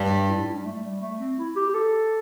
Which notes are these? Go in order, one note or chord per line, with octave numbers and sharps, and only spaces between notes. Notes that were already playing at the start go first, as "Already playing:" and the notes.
Already playing: G2 G3
G4
E4
E4
D4
G3
A3
G3
A3
C4
E4
G4
G4
A4